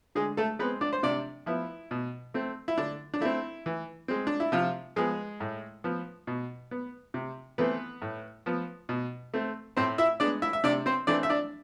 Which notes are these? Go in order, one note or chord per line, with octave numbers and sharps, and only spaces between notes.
D3 G#3 G#4
A3 A4
G#3 B3 C4 B4
D4 D5
C5
C3 D4 D5
F3 B3 E4
B2
A3 C4
E4
D3 D4
D4
A3 C4 E4
E3
G#3 C4
D4
E4
C3 F3 F4
F3 G#3 B3 G#4
A2
F3 B3
B2
B3
C3
E3 A3 B3 C4 B4
A2
F3 B3
B2
A3 C4
A2 C4 C5
E4 E5
G#3 B3 D4 D5
E4 E5
E5
C3 D4 D5
C4 C5
E3 A3 C4 D4 D5
E5
D4 D5